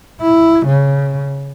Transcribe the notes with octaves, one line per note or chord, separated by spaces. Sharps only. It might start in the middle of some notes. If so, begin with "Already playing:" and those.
E4
C#3